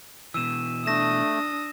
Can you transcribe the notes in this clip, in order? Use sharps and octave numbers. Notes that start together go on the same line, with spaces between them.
B2 E3 E6 D#7 E7
A3 D4 D#6 A#6 E7